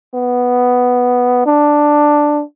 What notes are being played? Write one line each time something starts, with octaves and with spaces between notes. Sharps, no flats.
B3
D4